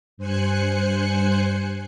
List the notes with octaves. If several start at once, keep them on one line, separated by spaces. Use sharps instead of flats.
G2 C5 G#5 F#6 C#7